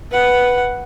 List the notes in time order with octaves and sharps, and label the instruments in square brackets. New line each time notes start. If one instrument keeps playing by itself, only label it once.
[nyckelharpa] B4 F#5